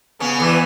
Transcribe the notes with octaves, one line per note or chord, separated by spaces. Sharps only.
C#3 B3 C#4
E2 E3